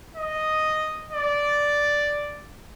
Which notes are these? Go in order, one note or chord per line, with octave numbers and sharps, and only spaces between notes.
D#5
D5